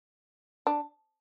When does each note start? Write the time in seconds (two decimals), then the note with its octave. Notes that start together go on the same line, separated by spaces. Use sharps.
0.67 D4